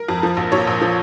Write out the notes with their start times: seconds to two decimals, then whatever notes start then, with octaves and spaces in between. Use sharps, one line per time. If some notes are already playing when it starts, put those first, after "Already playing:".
Already playing: A#4
0.08 F2
0.23 F3
0.37 A#1
0.52 A#2 C#5
0.67 A#1
0.82 F3